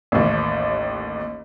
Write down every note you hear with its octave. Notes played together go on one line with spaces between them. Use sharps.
A1 D#2